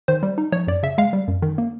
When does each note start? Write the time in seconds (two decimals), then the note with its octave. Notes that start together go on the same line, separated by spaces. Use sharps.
0.08 D#3 C5
0.23 G3
0.38 D#4
0.52 F3 C#5
0.67 F#2 D5
0.83 C#3 E5
0.98 G#3 F5
1.13 G3
1.28 F#2
1.42 D#3
1.58 A#3